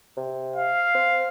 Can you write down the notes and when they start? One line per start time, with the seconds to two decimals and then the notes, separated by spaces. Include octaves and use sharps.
0.17 C3
0.56 F5
0.94 C4